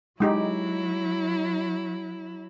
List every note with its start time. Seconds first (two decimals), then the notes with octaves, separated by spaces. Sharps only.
0.20 F#3 G#3 D#4 E4 G4